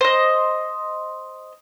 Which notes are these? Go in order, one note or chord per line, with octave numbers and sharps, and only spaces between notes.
C5 D#5